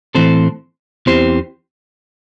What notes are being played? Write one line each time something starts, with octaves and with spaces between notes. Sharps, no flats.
A2 E3 C4 A4 C5
E2 E3 C4 G4 C5